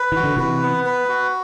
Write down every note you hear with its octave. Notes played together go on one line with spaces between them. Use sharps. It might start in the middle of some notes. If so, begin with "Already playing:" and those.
Already playing: B4
E3 F#4
D3
C3 E3 B4
B3
B4
F#4